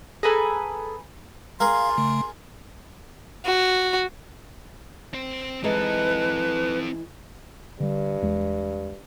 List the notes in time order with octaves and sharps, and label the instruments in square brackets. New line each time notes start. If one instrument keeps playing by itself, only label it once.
[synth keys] G#4 A4 [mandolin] B4 G#5 A#5
[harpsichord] G#4 A#4 [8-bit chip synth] F5 [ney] C6
[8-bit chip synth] C#3 A3
[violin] F#4
[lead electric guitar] C4 C5
[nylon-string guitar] E3 G#3 D#4 [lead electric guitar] C4 A4 [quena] B4
[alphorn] G2 [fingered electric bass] D3 G3
[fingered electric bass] E2 E3 G#3